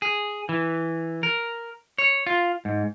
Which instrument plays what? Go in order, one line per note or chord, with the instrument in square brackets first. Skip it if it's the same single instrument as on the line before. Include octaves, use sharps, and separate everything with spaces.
[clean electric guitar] G#4
E3
A#4
C#5
F4
G#2